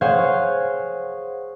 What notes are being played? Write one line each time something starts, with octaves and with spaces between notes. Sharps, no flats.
G#4 C5 C#5 F5 F#5